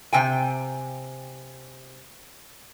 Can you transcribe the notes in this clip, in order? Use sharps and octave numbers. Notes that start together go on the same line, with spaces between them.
C3 G5 G#5